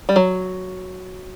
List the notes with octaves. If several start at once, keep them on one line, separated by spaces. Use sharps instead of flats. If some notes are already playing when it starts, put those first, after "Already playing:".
G3
F#3